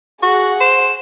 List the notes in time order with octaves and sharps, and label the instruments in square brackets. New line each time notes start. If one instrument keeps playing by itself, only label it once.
[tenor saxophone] F#4 [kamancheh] G#4 F#5
[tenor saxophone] C5 [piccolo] E7